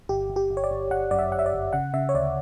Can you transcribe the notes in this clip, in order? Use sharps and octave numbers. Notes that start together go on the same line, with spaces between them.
G1 G4
G1
G4
G1
C#5
D5
G1
G1 F#5
F#2 D5
E5
G1 F#5
E5
D5
G1
C#3 F#5
C#3 E5
C#5
D2 D5